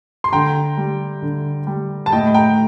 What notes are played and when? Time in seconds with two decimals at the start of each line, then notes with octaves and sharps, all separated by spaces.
0.24 C6
0.32 D3 G5 A#5
0.77 G3
1.22 D3
1.67 G3
2.06 A5
2.12 A2 D#5 G5
2.34 G5 A#5